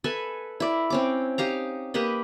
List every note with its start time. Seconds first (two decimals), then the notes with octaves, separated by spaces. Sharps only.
0.04 A4 B4 E5 G#5
0.60 E4 D5
0.90 C4 C#4 D6
1.38 D#4 G4 F5 A#5
1.94 A#3 G4 B4 D#5